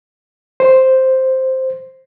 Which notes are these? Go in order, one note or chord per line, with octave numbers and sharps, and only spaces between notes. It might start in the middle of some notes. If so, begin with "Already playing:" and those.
C5